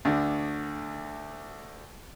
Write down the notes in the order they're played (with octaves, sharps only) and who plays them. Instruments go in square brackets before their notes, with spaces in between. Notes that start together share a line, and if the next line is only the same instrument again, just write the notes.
[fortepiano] D2 D3